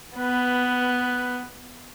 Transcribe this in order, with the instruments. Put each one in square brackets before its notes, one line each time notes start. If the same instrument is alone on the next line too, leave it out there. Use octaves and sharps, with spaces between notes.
[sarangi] B3 [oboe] B4